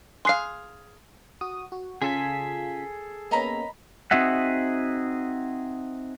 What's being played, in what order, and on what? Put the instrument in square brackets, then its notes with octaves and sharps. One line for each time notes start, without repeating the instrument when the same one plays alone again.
[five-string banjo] G#4 F5 [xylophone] C6 F#6 C7
[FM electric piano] F#4 D#6
F#4
[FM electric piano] C#3 F4 B6 [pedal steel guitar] G#4 A4 G#5
[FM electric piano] A#3 B3 C#4 [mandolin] D#5 A#5 B5
[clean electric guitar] C4 D#4 F#4 G#4 E5 F#5